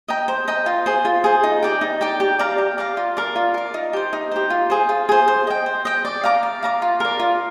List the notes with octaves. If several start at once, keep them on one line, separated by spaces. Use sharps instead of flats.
D#5 G5 A#5
C5
D#5 G5 A#5
F4
G#4 C5
F4
G#4 C5
D#4
G4 D5 G5
D#4
G4 D5 G5
G4
D5 F5 A#5
G4
D5 F5 A#5
F4
A#4 D5
F4
A#4 D5
D#4
G4 C5
D#4
G4 C5
F4
G#4 C5
F4
G#4 C5
C5
D#5 G5
C5
D#5 G5
D5
F5 A#5 D6
D5
F5 A#5 D6
F4
A#4 D5
F4